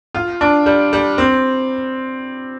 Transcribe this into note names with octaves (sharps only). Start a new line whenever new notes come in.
F4
D4
G3
G3
C4